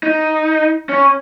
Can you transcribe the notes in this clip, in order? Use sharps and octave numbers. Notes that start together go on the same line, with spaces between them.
D#4
C#4